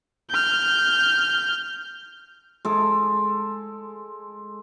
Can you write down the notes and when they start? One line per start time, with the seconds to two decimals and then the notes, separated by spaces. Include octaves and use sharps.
0.30 F6 G6
2.65 G#3 A4